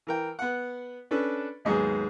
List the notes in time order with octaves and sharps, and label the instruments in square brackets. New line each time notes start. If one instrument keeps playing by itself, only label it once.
[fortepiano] E3 A#4 G5
B3 F#5
C#4 D4 A4 B4
D#2 G#2 F#3 B3 G#4